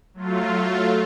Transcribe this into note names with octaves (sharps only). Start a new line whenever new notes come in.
F#3 A3 F4